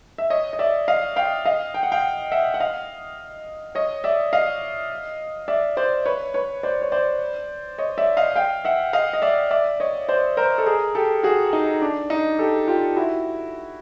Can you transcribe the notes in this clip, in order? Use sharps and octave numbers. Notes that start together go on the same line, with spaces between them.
E5
C#5 D#5
D#5
D5 E5
D#5 F5
F5 G5
D#5 F5
G5
F#5
F5 G5
E5 F#5
F#5
D#5 F5
C#5 D#5
D5 E5
D#5 F5
D5 E5
C5 D5
B4 C#5
B4 C#5
C5 D5
C#5
C5 D5
C#5 D#5
D5 E5
D#5 F5
F5 G5
E5 F#5
D#5 F5
D#5
D5 E5
D5 E5
C#5 D#5
C5 D5
A#4 C5
A4
G#4 A#4
G4 A4
F#4 G#4
D#4
D4
D#4
G4 A4
F4 G4
E4 F#4